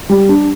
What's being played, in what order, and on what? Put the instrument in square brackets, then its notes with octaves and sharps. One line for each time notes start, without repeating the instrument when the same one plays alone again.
[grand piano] G3
D4